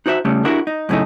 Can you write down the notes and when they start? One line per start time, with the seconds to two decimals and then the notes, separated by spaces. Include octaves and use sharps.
0.06 D#4 F#4 C5 C#5 E5
0.25 C#3 G3 A3 C#4
0.45 D4 E4 F#4 G4 A#4
0.67 D#4
0.89 F#2 A2 C#3 A3 D#4